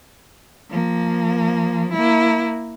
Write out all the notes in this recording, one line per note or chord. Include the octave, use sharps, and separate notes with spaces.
F3 A#3
A#3 E4